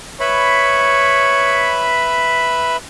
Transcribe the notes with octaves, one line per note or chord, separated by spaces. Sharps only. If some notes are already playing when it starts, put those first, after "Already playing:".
B4 C#5 E5 B5